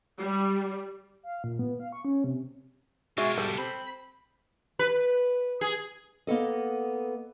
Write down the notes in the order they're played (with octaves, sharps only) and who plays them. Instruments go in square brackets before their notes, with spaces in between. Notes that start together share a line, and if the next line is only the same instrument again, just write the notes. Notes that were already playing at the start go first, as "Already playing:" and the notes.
[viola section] G3
[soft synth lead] F5
A#2
B3
F5
C#6
C#4
C3
[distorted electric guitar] B2 F4 [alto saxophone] G#3 [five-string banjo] F#4 E5
[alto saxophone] G3 [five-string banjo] A4
[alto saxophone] C4 [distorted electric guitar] B5
[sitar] B4
G#4
[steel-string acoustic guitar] A#3 B3 A4 D#5